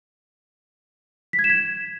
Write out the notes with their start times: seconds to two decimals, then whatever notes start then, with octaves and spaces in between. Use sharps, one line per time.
1.33 B6
1.39 G#6
1.44 E7
1.50 G#6